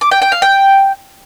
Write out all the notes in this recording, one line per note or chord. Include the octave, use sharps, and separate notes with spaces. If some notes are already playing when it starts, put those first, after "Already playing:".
D6
G5
G5
F5
G5